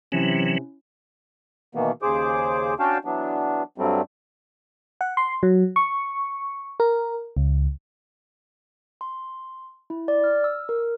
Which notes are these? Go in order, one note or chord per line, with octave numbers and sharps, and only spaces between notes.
C3 E3 F#3 C#4 E4
B2 D#3 E3 A#3 B3
D#2 C#3 G#4 C5 D6
C#4 D4 F#4 F5 G5 A5
E3 F#3 B3 D4
G2 F#3 G3 A3 C4
F#5
C6
F#3
C#6
A#4
C#2
C6
E4
D5
F6
E6
A#4